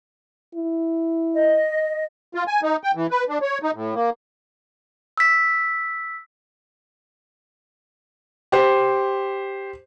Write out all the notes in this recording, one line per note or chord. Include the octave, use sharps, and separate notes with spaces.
E4
D#5
F4
G#5
D#4
G5
E3
B4
D4
C#5
D#4
A2
A#3
E6 B6
G4 C5